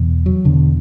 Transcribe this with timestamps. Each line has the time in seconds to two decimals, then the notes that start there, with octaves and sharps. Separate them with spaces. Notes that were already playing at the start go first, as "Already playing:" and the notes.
Already playing: E2 B2
0.26 F#3
0.45 E2 B2 D3